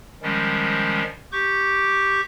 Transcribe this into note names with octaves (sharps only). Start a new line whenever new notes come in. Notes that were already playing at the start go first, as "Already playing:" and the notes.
D#3 F3 G3 G#3 C#4
G4 C#6 D6 G6